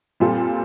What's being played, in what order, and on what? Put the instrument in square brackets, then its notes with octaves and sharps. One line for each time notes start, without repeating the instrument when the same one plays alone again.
[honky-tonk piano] A#2 G3 C4 F4 A4